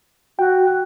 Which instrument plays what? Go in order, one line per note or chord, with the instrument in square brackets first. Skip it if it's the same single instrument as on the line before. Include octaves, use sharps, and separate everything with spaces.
[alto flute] F#4 [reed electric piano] G5